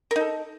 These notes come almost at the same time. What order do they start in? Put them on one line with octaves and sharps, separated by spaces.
A#4 D#4 A4